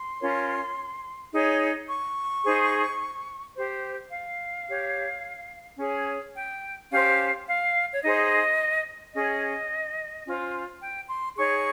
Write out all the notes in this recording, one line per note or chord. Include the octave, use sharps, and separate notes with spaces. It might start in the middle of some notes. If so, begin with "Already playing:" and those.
Already playing: C6
C#4 F4 A#4 C#5
D#4 G#4 C#5
C#6
D#4 G#4 C5
G4 C5
F5
G4 C#5
C#4 G#4 C#5
G5
C#4 G4 C5 F5
F5
C#5
D#4 G#4 C5 D#5
C#4 G#4 C#5 D#5
C#4 F4 C5
G5
C6
D#4 G#4 C#5 C#6